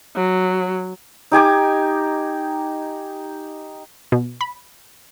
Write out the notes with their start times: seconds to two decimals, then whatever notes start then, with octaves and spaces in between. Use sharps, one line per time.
0.15 F#3
1.31 D#4 G4 G#5 D6
4.12 B2
4.41 B5